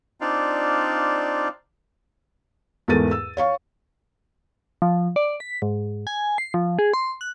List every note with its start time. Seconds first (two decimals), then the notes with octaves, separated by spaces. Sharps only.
0.21 C4 D4 D#4 F4 D5 F5
2.88 E2 G#2 A3 A#4 A6 D#7
3.11 E6
3.37 C#5 F5 C#6
4.82 F3
5.16 D5
5.40 B6
5.62 G#2
6.07 G#5
6.38 C7
6.54 F3
6.79 G#4
6.94 C6
7.21 F#6